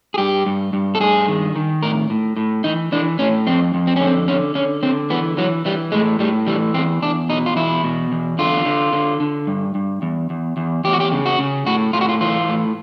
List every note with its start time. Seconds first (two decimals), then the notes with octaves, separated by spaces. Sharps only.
0.14 G#4
0.18 G2 G4
0.46 G2
0.73 G2
0.95 A4
1.00 G2 G#4
1.28 D#3
1.56 D#3
1.83 A2 A#4
2.10 A2
2.36 A2
2.64 E3 D#4
2.92 E3 D4
3.19 A2 C#4
3.47 F2 C4
3.74 F2
3.87 C4
3.96 C#4
4.01 D3
4.06 C4
4.28 D3 C#4
4.55 D3 C#4
4.83 D3 C4
5.10 E3 B3
5.37 E3 F#3
5.65 E3 G3
5.92 A2 G#3
6.19 A2 G3
6.47 E3 G3
6.74 E2 C4
7.02 E2 D4
7.29 B2 D#4
7.46 F4
7.56 E2 E4
7.84 B2
8.12 E2
8.39 D3 F4
8.65 D3
8.93 D3
9.20 D3
9.47 G2
9.75 G2
10.02 E2
10.30 E2
10.57 E2
10.84 E2 G4
10.93 F#4
11.00 G4
11.12 C#3
11.25 F#4
11.39 C#3
11.66 A2 F#4
11.93 A2 F4
12.01 F#4
12.09 F4
12.21 E3 F4
12.49 A2